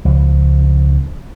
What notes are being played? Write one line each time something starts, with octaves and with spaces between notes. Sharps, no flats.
C#2 F3